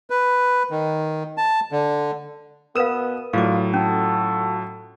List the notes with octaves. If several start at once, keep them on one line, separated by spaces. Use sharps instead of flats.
B4
D#3
A5
D3
B2 B3 A#4 B4 F5 D#6 E7
A2 F#3 D4 F4 F5 D6
C#4 F4 F#4 A4